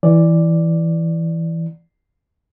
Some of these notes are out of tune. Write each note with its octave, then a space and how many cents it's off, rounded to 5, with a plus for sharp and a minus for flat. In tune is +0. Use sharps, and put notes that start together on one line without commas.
E3 +0 D5 +0